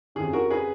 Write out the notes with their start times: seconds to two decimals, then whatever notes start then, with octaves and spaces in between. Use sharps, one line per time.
0.15 F2 C#3 G#4
0.33 F#4 A#4
0.50 G#4 B4